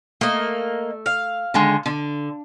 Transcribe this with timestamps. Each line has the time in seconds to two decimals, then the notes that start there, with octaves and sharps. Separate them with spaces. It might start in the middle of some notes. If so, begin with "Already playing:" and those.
0.21 A3 A#3 D#5
1.06 F5
1.54 D3 D#3 G#3
1.86 D3